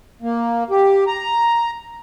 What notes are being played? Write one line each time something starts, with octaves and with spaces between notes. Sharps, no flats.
A#3
G4
A#5